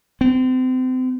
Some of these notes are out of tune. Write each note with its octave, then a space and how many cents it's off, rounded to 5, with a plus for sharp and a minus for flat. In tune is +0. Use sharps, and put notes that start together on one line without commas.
C4 -35